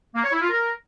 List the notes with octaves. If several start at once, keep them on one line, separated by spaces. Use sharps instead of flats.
A#3
C#5
E4
F4
A#4